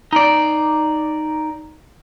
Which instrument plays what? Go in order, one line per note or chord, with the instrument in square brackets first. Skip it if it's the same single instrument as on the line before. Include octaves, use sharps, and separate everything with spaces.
[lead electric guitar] D#4 D5